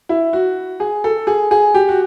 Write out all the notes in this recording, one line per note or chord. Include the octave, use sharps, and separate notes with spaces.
E4
F#4
G#4
A4
G#4
G#4
G4
F#4